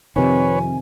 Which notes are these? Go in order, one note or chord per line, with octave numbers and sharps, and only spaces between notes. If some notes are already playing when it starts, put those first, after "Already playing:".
F2 C3 D#3 B4 C#5 G#5